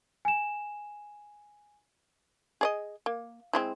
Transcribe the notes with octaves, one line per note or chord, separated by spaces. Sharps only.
G#5 E7
G#4 D5 D#5
A#3
G#3 C4 E4